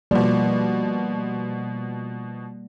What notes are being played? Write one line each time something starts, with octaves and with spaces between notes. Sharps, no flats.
B2 F3 G3 A#3 D5